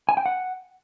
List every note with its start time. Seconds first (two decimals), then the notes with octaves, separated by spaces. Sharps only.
0.09 G#5
0.17 G5
0.26 F#5